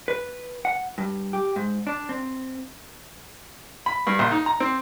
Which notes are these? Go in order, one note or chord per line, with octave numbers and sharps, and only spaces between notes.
B4
F#5
G2
G4
G#2
D4
C4
B5
G2
A#1
D#4
A#5
C4